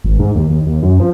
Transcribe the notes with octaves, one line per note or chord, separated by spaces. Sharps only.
G#1
G#2
D#2
D#2
D#2
F#2
F3